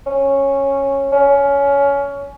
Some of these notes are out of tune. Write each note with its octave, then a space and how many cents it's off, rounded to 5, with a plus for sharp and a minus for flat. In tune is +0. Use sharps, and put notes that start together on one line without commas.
C#4 -10
C#4 +20